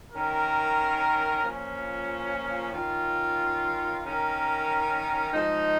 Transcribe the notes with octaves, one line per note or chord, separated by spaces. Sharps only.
D#3 C#4 A#4
A#2 F3 C#4
D#3 C#4 F4
D#3 C#4 A#4
F3 G#3 D#4